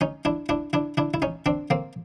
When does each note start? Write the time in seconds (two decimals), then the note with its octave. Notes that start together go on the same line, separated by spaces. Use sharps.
0.01 C#4 D#4
0.25 D4 E4
0.49 D4 E4
0.73 D4 E4
0.97 D4 E4
1.14 E4
1.22 C#4 D#4
1.46 C4 D4
1.70 A#3 C4